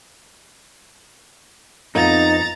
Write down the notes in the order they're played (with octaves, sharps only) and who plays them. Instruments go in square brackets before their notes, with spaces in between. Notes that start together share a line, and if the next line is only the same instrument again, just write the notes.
[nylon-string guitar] F2 B3 [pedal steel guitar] D#4 [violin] A#5 A6